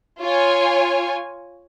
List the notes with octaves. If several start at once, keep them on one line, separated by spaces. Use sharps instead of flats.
F4 C#5 G#5